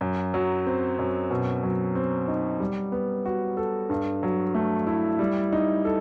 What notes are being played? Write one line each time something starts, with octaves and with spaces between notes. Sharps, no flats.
F#2
F#3
C4
F#2
B2
F#3
C4
D#4
G3
B3
F#4
A4
G2
F#3
A3
E4
G3
D#4
A4